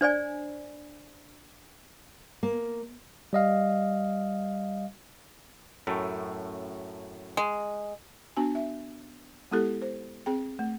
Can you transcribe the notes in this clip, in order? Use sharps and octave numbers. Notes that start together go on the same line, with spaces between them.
D4 C5 D5 G#5
A#3
G3 D#5 F5
F#2 A2 A3
G#3
B3 D4 F#4 G#5
E5
G#3 B3 E4 G4 A4
C5
C4 G#4 G5
A3